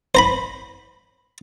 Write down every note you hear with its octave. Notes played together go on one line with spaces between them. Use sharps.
C5 A#5 B5